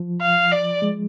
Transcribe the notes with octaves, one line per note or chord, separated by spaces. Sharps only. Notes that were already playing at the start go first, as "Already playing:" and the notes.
Already playing: F3
F5
D5
G#3